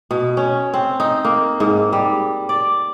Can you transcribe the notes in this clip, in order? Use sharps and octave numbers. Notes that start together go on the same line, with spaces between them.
B2
C#4
C4
D#4
A#3
G#2
G3
D5